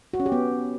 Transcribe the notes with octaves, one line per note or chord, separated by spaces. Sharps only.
F#4
C#4
G4
B3